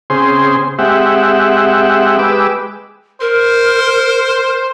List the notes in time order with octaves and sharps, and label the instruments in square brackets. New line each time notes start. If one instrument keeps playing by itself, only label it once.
[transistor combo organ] C#3 C4 G#4 C5 C6
G#3 C4 G4 E5 F#5
G#3 G4 B4 D6 E6
[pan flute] A#4 [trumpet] C5